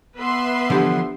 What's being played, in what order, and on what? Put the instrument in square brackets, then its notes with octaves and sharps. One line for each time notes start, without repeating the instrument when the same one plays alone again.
[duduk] B3 [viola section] B4 E5 C6
[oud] D3 E3 F3 [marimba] D4 G4 F#5